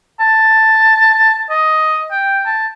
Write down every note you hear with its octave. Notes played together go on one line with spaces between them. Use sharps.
A5
D#5
G5
A5